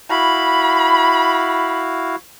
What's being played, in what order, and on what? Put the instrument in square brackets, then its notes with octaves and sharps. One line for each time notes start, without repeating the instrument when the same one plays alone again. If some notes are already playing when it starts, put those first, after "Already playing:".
[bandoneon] E4 F#4 F5 [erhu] B5